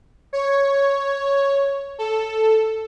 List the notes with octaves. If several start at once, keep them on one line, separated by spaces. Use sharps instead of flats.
C#5
A4